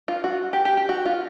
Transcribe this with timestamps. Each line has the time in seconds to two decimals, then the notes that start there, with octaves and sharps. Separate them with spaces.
0.08 F4
0.24 F#4
0.53 G4
0.65 G4
0.77 G4
0.89 F#4
1.06 F4